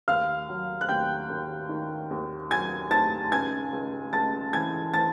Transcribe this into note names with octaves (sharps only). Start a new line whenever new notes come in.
D#2 F5 F6
F#3
F#6
D#2 G5 G6
D#2
D#3
D#2
F#3 G#5 G#6
D#3 A5 A6
C#2 G#5 G#6
C#2
C#2 A5 A6
E3 G#5 G#6
E3 A5 A6